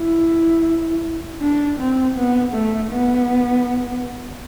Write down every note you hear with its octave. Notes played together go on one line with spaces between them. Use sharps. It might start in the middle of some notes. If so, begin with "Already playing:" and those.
Already playing: E4
D4
C4
B3
A3
B3